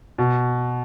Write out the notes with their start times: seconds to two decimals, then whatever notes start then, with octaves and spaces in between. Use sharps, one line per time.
0.18 B2